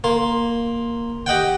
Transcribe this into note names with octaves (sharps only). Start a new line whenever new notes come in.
A#3 C6
G4 D#5 F#5 G5